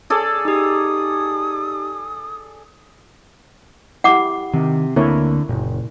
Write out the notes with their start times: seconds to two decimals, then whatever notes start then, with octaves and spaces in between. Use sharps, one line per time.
0.10 G#4 A4 D5
0.45 D#4 G4 D#6
4.04 E4 G4 F#5 D6
4.54 C3 D#3
4.96 D2 D3 A#3 C4 E4 A#4 C#5
5.49 F#1 A#2